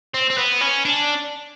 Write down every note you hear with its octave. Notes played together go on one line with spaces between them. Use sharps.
C4
C4
B3
C#4
D4